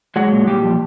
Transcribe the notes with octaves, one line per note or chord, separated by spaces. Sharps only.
F#3 G#3 F#4
A#2
A#2 G3 G4
F3